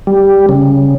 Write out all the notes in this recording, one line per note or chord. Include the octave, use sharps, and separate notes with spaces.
G3
C#3